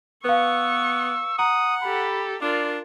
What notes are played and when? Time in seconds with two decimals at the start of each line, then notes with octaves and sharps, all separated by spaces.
0.25 B3 B4 F5 C#6 E6
1.39 F#5 A#5 D#6
1.83 G4 A4 B5
2.42 D4 F4 A#4 D5